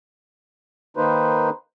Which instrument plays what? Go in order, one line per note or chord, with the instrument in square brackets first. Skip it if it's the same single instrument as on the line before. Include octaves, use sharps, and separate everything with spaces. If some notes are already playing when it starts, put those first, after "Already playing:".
[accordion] D#3 A#3 D#4 B4 C5